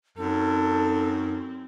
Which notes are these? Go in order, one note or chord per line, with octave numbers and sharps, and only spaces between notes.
F#2 C4 D#4 A4